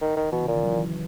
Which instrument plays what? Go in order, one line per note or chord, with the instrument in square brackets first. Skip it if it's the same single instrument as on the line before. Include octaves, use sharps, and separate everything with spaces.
[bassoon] D#3
D#3
[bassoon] B2 [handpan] E3
[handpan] C#3
[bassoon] A#2
[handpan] D#3
F#3
E3
F#3